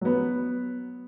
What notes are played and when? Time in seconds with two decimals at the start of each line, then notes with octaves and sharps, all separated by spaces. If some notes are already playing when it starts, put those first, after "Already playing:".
0.01 F#3 B3